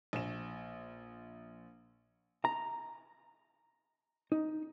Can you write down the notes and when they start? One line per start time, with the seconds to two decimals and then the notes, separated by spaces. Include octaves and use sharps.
0.13 A#1 E7
2.45 A#5
4.32 D#4